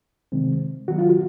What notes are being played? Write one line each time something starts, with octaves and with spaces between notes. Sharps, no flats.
C3 D#3 G#3 C4
D#3 F#3 B3 F#4
F4
F#4